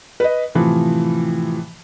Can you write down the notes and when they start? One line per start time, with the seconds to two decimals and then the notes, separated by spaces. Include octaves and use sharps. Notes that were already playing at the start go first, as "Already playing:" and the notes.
0.20 B4 D#5
0.55 A2 C3 E3 F3